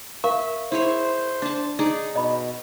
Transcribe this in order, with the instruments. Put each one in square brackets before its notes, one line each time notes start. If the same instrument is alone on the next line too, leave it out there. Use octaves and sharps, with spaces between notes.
[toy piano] A#4 F5 C#6 [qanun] E5
[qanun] E4 G#4 C#5 [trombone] C5
[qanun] D4 A5
D#4 G#4 D5
[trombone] B2 [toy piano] D#5 B5